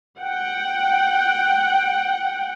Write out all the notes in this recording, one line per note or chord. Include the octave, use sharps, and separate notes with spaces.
F#5 G5